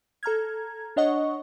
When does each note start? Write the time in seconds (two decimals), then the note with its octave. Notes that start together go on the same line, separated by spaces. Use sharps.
0.23 A4 A#5 F6 G#6
0.96 D4 C#5 D#5 F#5 C#6